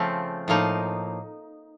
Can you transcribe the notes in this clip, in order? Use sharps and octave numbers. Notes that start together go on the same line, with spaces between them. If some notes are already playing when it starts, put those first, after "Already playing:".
Already playing: C#3 F3 A3 C4
A2 F3 A#3 D#4